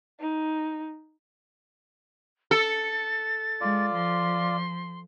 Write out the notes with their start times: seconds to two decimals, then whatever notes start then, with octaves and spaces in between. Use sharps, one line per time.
0.20 D#4
2.51 A4 A6
3.61 G#3 F4 D5
3.93 F3 C6